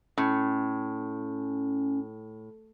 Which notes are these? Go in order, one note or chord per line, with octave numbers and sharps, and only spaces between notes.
A2 C#4